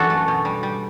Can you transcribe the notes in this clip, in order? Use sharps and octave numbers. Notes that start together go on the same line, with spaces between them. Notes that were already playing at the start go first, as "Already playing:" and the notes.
Already playing: F#2 E3 D4 F#4 A4
A3
B2
G3
G3